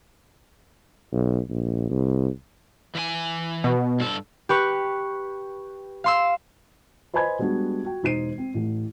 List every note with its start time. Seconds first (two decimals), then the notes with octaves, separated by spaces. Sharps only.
1.12 B1
1.50 A#1
1.90 C2
2.95 E3 E5 G#5
3.64 B2
4.00 G2 A4
4.49 G4 B4 C#6
6.04 F5 C6 E6
7.14 B4 C5 D#5 G#5 B5 G#6
7.39 G3 G#3 B3 D4 F#4
7.84 F#4 G5
8.03 E1 D#4 C5 C7 D#7
8.38 C4
8.54 A1 A2